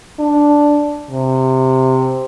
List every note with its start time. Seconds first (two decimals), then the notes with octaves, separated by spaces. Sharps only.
0.19 D4
1.11 C3